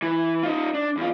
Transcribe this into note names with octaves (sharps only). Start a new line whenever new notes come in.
E3
D#4 F4
D4
E2 F4